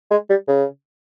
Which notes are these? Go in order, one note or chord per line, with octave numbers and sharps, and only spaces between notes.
G#3
G3
C#3